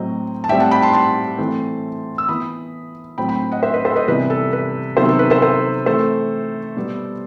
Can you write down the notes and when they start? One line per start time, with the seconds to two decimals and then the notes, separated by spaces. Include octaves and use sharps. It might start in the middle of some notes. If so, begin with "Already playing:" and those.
Already playing: A2 F#3 C4 D#5
0.44 A5
0.49 A2 G3 C4 E5 G5
0.60 F#5 A5
0.71 G5 B5
0.82 A5 C6
0.93 A5 C6
1.39 E3 A3 C4
2.18 E6
2.28 E3 B3 B5 D#6
3.18 A2 F#3 C4 G5 B5
3.29 G5 B5
3.52 D#5 F#5
3.63 C5 E5
3.74 B4 D#5
3.85 A4 C5
3.96 B4 D#5
4.07 C3 E3 G3 B3 B4
4.30 A4
4.53 B4
4.97 C3 D#3 F#3 B3 A4 C5
5.09 A4
5.19 B4
5.30 A4 C5
5.42 A4 C5
5.86 E3 A3 C4 A4 C5
6.76 B2 G3 B3